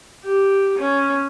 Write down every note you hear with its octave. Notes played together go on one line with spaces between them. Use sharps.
G4
C#4